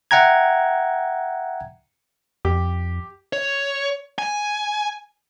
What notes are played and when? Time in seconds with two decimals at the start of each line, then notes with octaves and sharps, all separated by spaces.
0.11 E5 F#5 G5 A#5 G#6
2.45 F2 G4
3.33 C#5
4.19 G#5